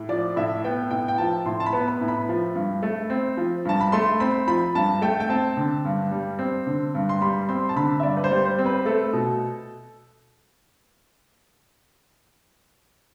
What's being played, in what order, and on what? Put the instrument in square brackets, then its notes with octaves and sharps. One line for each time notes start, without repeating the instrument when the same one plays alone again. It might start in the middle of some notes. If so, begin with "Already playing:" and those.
Already playing: [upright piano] A2
F3 D5
A2 E5
B3 G5
A2 G5
G5
F3 A5
A2 C6
A5
B5
B3
B5
A2
B5
F3
G2
A3
C4
F3
G2 A5
B5
A3 C6
C4 B5
F3 B5
G2 A5
A3 G5
G5
C4 A5
D3
G2
G3
C4
D3
G2
C6
G3 B5
C4 C6
A5
D3 B5
E5
G2 D5
B4
C5
G3
C5
C4
B4
A3 A4
B2